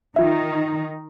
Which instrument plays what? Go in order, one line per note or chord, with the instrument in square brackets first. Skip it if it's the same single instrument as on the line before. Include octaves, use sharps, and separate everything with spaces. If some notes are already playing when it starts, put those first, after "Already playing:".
[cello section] D#3 D#4 [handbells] F4 E5